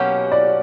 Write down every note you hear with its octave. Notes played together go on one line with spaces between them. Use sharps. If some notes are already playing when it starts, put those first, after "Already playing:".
Already playing: B2 F#3 A#3 C#4 G4 F#5
D5